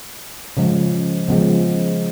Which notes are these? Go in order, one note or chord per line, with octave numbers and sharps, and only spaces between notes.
C#3 F3 G#3
C#3 F3 G#3 B3